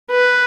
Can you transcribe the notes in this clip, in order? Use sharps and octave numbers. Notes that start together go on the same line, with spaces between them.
B4